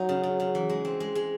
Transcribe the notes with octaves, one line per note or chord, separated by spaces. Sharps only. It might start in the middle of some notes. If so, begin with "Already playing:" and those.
Already playing: F#3 D#4 F#4
C#3
C#3
C#3
E3
G#3
C4
G#3
G#3